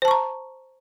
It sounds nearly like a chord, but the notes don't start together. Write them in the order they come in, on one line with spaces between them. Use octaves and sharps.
C5 A5 C#6 A#5